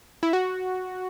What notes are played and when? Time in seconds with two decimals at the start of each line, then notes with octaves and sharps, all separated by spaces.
0.23 E4
0.33 F#4